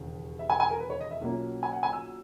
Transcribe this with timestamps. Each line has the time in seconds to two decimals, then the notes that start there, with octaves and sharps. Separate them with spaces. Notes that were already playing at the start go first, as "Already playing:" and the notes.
Already playing: E1 D#2 C#3
0.39 E5
0.50 G#5
0.60 G#5
0.70 A#4
0.80 B4
0.90 C#5
1.01 D#5
1.11 E5
1.21 B1 A#2 F#3 A#3 C#4
1.63 G#5
1.73 F#5
1.83 G#5
1.93 E6